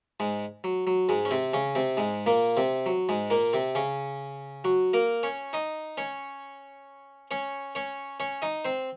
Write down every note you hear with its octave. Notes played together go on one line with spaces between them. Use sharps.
G#2 G#3
F#3
F#3
G#2 G#3
C#4
C3 C4
C#3 C#4
C3 C4
G#2 G#3
A#2 A#3
C3 C4
F#3
G#2 G#3
A#2 A#3
C3 C4
C#3 C#4
F#3 F#4
A#3 A#4
C#4 C#5
D#4 D#5
C#4 C#5
C#4 C#5
C#4 C#5
C#4 C#5
D#4 D#5
C4 C5